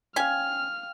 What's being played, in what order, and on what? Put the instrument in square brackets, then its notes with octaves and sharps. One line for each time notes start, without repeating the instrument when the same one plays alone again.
[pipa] C#4 G#5 [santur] F5 G5 [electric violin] F6